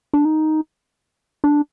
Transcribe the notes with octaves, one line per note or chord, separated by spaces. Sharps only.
D4
D#4
D4